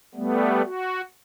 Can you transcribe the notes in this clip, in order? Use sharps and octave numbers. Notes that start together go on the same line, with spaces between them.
G3 A3 B3
F#4